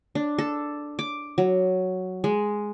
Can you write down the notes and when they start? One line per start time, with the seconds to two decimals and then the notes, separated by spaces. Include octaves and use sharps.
0.15 D4
0.38 A4
0.99 D6
1.38 F#3
2.24 G#3